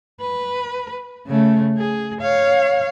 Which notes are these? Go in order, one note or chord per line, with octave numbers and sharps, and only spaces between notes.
B4
C#3 A3
G#4
C#5 F5